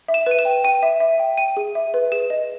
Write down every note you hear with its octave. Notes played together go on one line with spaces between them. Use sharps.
E5
E7
B4 D#7
E7
G5
G5 D#7
E5
E5
G5
G5 D#7
G#4
E5
B4
G#4 E7
D#5